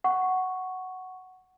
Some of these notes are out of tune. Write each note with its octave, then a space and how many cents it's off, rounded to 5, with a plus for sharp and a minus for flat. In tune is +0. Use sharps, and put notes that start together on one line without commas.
F#5 +5 C#6 +0